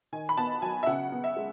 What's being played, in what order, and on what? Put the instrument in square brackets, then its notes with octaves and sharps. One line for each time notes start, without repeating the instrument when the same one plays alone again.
[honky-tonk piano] D#3 G#5
B5
B3 A5
F#3 G#5
E5
C#3 F#5
B3
E5
G#3